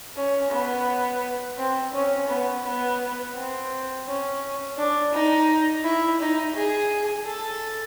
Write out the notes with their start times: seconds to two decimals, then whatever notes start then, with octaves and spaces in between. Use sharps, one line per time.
0.16 C#4
0.50 B3
1.58 C4
1.93 C#4
2.28 B3
2.64 B3
3.35 C4
4.06 C#4
4.77 D4
5.13 D#4
5.84 E4
6.20 D#4
6.55 G#4
7.26 A4